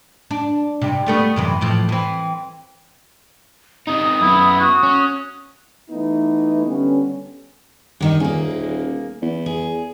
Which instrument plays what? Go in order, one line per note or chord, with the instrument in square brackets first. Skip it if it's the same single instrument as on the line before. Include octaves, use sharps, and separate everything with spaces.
[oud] D4
G2 C3
G3 A3 B3
F#2 C3 E3
A2 E3 F3
E3 C4
[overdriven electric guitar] C3 D#4 [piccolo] D#6
[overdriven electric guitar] F#2 B3 [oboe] E4
[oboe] F#4
[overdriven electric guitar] C#4
[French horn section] E3 A3 B3 D#4 E4
D3 G3 B3 C#4
[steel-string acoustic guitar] G2 D#3 D#4
[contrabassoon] D#1 [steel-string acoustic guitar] A#3 G#4
[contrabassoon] E2
[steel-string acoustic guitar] G#4